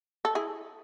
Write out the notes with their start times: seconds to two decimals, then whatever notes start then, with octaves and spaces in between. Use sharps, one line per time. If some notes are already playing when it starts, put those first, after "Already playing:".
0.25 A4
0.35 E4 G#4